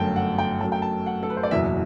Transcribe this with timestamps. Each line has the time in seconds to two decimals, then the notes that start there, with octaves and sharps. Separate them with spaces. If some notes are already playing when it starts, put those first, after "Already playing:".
Already playing: G1 F#2 F#3 A3 G5 A5
0.16 F#5
0.38 G5
0.61 F#2 F#3 A3 A5
0.72 G5
0.82 A5
1.06 F#5
1.23 A4
1.30 B4
1.37 C5
1.43 D5
1.51 F#1 E2 B2 F#3 E5